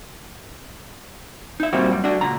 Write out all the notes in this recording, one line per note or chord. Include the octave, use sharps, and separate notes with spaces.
D#4 E5
A#2 G3 A#3 C4 F#4
F#2 G3
D4 F#4
C#2 A#2 A#5